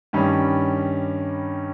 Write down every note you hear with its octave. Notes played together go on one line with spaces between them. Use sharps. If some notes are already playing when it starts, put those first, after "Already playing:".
G2 D#3 G3 C#4